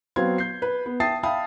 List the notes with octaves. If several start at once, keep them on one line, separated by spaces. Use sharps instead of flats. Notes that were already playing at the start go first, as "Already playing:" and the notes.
F#3 B3 C4 F5 C6 G#6
G6 C7
B4
B3
E5 G5 A5 D#6 A6 C7
E5 F5 G5 A5 B5 D#6